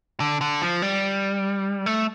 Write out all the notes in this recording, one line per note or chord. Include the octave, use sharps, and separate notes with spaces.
D3
D3
F3
G3
A3